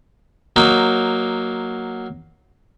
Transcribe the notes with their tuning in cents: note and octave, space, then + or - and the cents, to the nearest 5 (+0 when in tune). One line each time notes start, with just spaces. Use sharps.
F#3 +0 A#3 +0 D#4 -10